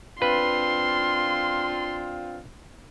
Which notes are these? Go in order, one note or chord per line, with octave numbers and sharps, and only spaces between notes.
C4 D4 F4 B4 C6